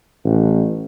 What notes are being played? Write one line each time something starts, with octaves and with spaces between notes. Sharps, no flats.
A1